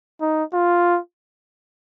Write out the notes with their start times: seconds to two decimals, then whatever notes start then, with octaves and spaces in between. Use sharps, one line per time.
0.21 D#4
0.54 F4